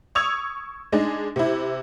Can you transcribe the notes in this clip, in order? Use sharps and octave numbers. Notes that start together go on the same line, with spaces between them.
C#6 D#6 E6 G#6 F7
G#3 D4 D#4
C3 E4